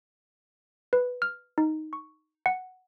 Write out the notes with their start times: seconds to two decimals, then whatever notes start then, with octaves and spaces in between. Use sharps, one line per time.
0.93 B4
1.22 F6
1.58 D#4
1.93 C#6
2.46 F#5